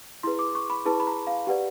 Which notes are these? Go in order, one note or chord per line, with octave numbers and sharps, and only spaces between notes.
E4 G#4 B4 C6
D6
C#6
B5
E4 G#4 B4 A5
B5
A#5
F5
G4 B4 D5 F#5